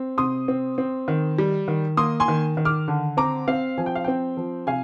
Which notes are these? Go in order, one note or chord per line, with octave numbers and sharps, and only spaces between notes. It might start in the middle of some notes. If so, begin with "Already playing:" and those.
Already playing: C4
C3 C6 D#6
C4
C4
D#3
G3
D#3
A#3 C6 D#6
G#5 C6
D#3
D#3
D6 F6
D3
C4 A#5 D6
C4 F5
F3 G#5
G5
F5
C4 G5
F3
C3 F5 G#5